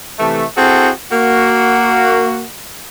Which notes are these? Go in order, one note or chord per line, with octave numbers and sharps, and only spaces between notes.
C3 E3 A3
C4 E4 F#4 G#4 A4
A#3 F#4